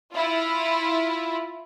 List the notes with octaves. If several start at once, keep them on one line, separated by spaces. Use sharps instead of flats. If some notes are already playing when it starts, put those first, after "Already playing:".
E4 F4